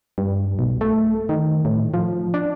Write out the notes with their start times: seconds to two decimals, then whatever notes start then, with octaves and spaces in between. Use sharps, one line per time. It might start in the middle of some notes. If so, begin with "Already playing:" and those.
0.18 G2
0.59 B1
0.81 A3
1.29 D#3
1.65 A2
1.94 F3
2.34 D4